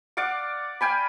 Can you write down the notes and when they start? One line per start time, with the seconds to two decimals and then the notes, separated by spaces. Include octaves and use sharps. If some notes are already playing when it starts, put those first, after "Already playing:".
0.17 D5 F5 F#5 D6
0.81 F5 G5 G#5 B5